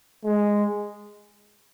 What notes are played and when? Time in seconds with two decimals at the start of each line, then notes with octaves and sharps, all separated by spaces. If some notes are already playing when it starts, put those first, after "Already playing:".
0.25 G#3